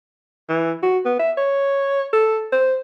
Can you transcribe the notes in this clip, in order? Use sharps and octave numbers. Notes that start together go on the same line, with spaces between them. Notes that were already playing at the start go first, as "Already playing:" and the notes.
E3
F#4
B3
E5
C#5
A4
C5